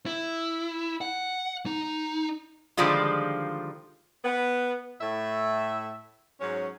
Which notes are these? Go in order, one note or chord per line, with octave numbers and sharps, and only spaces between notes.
E4
F#5
D#4
D3 D#3 F3 G3 G#3 F4
B3
A2 E5
G#2 F#3 C#4